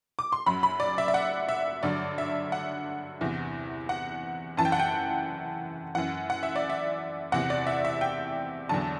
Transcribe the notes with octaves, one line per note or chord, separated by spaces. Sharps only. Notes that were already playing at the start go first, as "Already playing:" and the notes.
D6
C6
F#2 F#3 B5
B5
D5
E5
E5
F#5
E5
G2 D3 F#3 D5
E5
F#5
E2 C3 E3
F#5
F#2 E3 A5
G5
F#5
G5
F#2 E3 F#5
F#5
E5
D5
E5
E2 C3 E3 F#5
D5
E5
E5
G5
E2 D3 F#3 A5